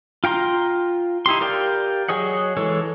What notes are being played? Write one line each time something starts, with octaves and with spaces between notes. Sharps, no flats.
F4 G5 A#5 C6
D#4 E4 G4 C6
G4 A#4 D5 F5 G5
F#3 G#4 C#5 D#5 F#5
E3 G#3 A4 C#5